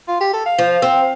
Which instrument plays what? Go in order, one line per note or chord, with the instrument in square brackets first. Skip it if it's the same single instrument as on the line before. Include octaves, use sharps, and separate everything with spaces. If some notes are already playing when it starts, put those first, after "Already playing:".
[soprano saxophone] F4
G4
A4
F5
[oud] F3
C4